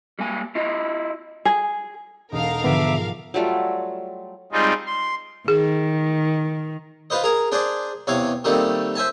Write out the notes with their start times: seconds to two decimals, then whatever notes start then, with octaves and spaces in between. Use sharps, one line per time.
0.19 G3 A#3 G#5
0.55 E4 F4 D#5
1.45 G#4
2.32 E1 B1 D#4 A4 A#4 D#5 F5
2.64 G#2 D3 F3 B3 E5 D6
3.34 F#3 G3 A3 F4
4.52 G3 G#3 C4 D#4 F4
4.86 C6
5.48 D#3 G#4
7.10 F4 B4 C5 D#5
7.23 G#4 A#4 A#5
7.52 D4 G#4 C5 D5
8.07 E2 C3 C#5 F5
8.44 D#3 G3 A3 A#3 C4
8.95 C5 E5 G#5 A5